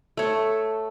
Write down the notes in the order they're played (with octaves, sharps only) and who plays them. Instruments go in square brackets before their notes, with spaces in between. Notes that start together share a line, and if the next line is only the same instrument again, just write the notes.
[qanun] A3 C#5